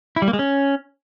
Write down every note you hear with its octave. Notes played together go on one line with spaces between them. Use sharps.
E4
G3
A#3
G#3
C#4